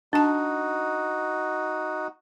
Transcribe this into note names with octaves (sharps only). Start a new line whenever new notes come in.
D4 D#4 F#4 A5